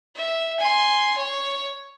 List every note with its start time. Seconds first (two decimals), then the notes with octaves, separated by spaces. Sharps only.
0.15 E5
0.59 G#5 C6
1.17 C#5